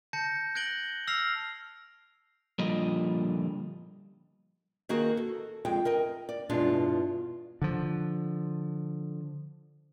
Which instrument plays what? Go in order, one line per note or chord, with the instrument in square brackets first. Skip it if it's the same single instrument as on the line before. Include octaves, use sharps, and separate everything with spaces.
[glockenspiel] A5 G6 A#6 C#7
F#6 G#6 A#6 D7 F#7 G7
E6 F6 A#6 C7 F7
[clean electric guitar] A#2 D3 F3 G3 F4 D#5
[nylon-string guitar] D#3 A#3 F#4 G#4 A#4
A4
F2 G#3 G5
A#4 D#5 G5
D5
E2 G2 B2 G#3 D4 F4
[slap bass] D3 F3